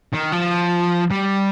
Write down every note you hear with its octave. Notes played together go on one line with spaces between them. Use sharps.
D#3
F3
G3